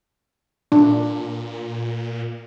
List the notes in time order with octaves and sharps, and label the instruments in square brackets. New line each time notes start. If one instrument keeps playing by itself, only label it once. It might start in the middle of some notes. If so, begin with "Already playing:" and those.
[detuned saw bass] A#2 [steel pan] D4